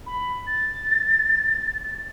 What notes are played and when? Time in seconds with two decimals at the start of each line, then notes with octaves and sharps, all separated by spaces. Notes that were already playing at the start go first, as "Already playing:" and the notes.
0.06 B5
0.47 A6